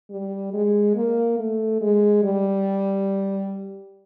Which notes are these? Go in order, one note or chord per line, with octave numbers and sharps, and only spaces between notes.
G3
G#3
A#3
A3
G#3
G3